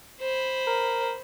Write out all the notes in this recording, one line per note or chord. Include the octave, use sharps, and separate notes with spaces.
C5 B5
A#4